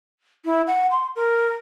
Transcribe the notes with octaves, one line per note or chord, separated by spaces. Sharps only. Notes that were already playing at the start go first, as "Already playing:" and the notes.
E4
F#5
C6
A#4